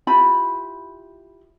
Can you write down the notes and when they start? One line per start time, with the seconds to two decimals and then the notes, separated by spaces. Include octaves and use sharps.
0.07 E4 F4 G4 B5